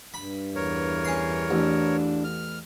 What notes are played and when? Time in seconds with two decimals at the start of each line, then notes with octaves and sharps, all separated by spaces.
0.14 G2 B5
0.56 E2 A#4 C#5
1.05 C#4 C6
1.51 A1 D4
2.24 F6